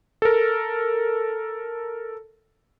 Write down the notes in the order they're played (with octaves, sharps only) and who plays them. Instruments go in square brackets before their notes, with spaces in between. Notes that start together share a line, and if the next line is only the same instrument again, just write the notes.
[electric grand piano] A4 A#4